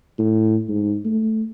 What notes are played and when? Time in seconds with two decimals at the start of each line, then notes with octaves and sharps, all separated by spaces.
0.19 A2
0.69 G#2
1.05 A3